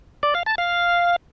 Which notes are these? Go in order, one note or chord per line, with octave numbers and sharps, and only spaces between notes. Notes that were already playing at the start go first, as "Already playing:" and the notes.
D5
F5
A5
F5